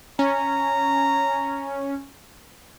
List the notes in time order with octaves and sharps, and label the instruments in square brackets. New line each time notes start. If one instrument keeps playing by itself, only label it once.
[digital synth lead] C#4 [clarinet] A#5